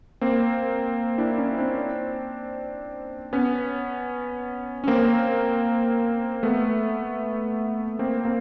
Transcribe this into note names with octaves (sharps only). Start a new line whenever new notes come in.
A#3 C4
D4 E4
C#4 D#4
C4 D4
B3 C#4
C#4
A#3 C4
A3 B3
A#3 C4
A#3 C4